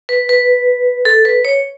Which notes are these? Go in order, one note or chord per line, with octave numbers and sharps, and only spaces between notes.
B4
B4
A4
B4
C#5